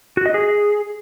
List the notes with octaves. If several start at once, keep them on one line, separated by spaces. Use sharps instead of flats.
F#4
D#5
G#4